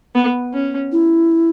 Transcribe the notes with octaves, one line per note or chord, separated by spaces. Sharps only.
B3
C#4
E4